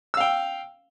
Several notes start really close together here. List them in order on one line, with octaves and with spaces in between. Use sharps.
E6 F5 G5